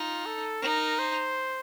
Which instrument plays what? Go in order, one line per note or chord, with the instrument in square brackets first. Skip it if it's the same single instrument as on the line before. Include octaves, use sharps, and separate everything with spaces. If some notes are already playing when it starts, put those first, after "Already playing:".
Already playing: [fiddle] D#4 [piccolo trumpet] F4
[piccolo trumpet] A4
[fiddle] D#4 [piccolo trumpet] A#4
[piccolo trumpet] C5